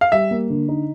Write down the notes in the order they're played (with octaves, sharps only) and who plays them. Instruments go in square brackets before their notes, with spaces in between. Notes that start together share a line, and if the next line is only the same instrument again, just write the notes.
[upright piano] F5
[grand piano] G3 [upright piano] E5
[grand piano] A#3
D3
D#4